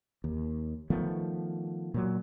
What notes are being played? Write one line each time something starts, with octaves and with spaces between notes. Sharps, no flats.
D#2
D#3 F3 A3 B3
A#2 F#3